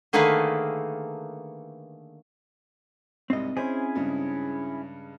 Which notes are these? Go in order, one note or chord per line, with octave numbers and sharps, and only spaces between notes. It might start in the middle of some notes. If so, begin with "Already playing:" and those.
D3 D#3 A3 A#3 G#4 B4
C2 G#2 G3 C4 D#5
C#4 E4 G#4 C5
G2 C#3 G#3